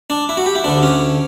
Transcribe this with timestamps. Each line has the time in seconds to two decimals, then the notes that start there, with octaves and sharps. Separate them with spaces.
0.10 D4
0.29 E4
0.37 F#4
0.46 G4
0.55 E4
0.64 D2 D3 D4
0.83 C#4